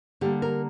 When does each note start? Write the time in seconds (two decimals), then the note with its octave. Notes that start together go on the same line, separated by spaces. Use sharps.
0.21 D3 G3 A#3 G4
0.42 A#4